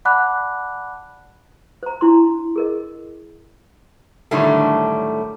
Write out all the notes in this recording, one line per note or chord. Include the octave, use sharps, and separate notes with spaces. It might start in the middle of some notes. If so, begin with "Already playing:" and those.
D5 F#5 A5 B5 D6 F#6
C5 A#5
D4 E4 C6
G#4 A#4 D#5
A2 D3 D#3 F#3 G3 A3